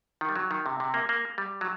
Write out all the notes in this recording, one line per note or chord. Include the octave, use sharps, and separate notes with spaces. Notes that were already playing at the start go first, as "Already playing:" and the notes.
D#3
G3
F#3
D#3
C3
C3
A#3
A#3
G3
F#3